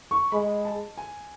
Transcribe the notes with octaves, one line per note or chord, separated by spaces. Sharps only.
C#6
G#3 B5
A5
G#5